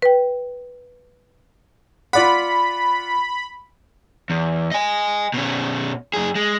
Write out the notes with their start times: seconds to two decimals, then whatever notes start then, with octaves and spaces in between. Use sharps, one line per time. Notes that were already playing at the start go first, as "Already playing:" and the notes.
0.02 B4 G5
2.13 F4 D5 F#5 B5
4.30 E2
4.72 D#5 G#5
5.34 B2 C#4
6.13 F#2 G#4
6.35 G#3